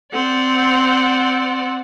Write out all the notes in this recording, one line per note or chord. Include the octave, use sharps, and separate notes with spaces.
C4 D5 F#5